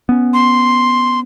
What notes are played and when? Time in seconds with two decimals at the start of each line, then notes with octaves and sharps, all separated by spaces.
0.09 B3 C#4
0.33 C6